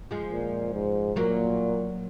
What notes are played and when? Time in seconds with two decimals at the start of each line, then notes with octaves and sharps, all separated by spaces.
0.11 F3 G#3
0.32 A#2
0.74 G#2
1.16 A#2 F#3 A#3